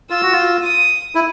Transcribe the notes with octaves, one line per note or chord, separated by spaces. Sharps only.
F4 E6
F#4
F4
D#6
E4